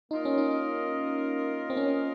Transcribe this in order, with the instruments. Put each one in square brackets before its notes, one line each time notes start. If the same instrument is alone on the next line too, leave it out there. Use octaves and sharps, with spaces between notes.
[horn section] A#3 F4 A#4 D#5 [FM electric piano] D#4
[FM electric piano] C#4
D#4
C4
C#4